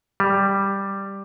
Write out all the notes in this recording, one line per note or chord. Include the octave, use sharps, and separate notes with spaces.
G3